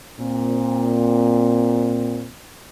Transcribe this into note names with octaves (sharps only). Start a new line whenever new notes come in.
A#2 C4